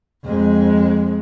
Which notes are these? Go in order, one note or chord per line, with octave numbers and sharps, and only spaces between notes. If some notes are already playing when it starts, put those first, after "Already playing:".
F2 G#3